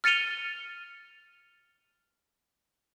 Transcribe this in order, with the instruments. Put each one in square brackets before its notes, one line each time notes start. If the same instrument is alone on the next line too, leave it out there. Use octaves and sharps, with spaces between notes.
[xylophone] F6 A6 C#7 D#7 F7 G7